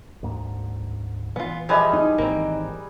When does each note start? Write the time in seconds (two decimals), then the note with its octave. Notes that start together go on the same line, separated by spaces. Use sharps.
0.23 D2 G#2 A#3
1.36 A#2 E3 B3 F4
1.69 F3 G3 G#4 B4 D#5 E5
1.93 D#4
2.18 G#1 D#3 E3 A#3 C4